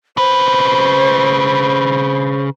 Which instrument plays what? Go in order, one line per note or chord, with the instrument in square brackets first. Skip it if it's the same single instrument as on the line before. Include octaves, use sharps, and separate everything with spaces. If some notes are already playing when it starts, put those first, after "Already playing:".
[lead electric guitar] C#3 B4 [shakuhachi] C5